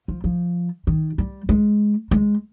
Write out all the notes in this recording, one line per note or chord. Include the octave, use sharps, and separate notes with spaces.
F3
F3
D#3
G3
G#3
G#3